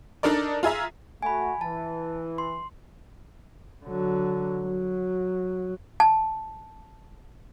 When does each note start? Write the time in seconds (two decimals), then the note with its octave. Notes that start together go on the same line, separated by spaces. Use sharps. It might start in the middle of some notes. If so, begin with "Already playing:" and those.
0.23 D4 D#4 A4 A#4 D5
0.63 F4 G#4 E5 A#5
1.22 A3 F#4 G#5 B5
1.61 E3 A5
2.38 C6
3.84 D3 F#3
4.62 F#3
6.00 A5